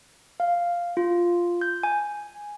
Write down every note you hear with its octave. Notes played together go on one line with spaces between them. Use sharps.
F5
F4
G6
G#5